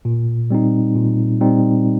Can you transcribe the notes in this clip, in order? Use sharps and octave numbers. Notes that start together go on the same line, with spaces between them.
A#2
G3 C4 D#4
A#2
G3 C4 D#4